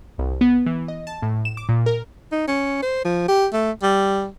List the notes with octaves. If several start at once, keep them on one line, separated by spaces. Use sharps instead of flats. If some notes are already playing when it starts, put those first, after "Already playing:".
C2
B3
E3
D#5
A5
A2
E7
D6
A#2
A#4
D#4
C#4
C5
F3
G4
A3
G3